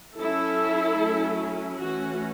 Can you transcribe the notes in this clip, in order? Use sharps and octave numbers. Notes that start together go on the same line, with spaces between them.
F#3 C#4 E4 A4
F#3 A3 C#4
E3 A3 C#4 F#4